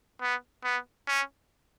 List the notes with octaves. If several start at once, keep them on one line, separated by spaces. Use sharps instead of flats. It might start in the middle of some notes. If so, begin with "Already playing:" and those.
B3
B3
C#4